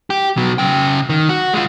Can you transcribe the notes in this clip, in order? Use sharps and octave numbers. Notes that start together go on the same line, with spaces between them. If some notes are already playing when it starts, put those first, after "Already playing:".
G4
B2 F#3
C#3 G5
D#3
F#4
G#3 F4